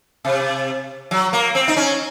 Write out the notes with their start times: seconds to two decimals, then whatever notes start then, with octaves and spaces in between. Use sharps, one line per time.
0.25 C3
1.11 F#3
1.33 A#3
1.55 C4
1.68 D#4
1.77 C#4